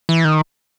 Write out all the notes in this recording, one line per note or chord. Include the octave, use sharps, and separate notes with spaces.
E3
D#3